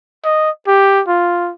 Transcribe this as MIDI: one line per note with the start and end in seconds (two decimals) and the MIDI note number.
0.24 0.50 75
0.67 1.02 67
1.07 1.51 65